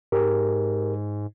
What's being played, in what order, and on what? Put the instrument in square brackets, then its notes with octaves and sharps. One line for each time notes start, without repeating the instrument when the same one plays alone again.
[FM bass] G#2 [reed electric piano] G4 A#4